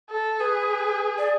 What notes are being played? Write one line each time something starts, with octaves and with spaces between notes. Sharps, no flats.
A4
G#4 B4
D5